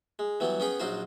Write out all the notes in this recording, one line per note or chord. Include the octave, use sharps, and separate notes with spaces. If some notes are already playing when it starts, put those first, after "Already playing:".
G#3
E3 F#3 G3 B3
B3 C#4 G#4 G5
A#1 F#3 D#4 F4 C5